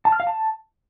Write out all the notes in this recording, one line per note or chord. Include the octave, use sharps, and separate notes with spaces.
A5
F6
F5
A5